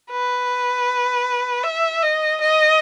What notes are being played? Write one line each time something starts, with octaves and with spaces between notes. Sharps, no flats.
B4
E5
D#5
D#5